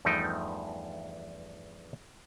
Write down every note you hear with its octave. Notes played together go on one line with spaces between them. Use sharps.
E2 G2 F3 A3 D#4 G5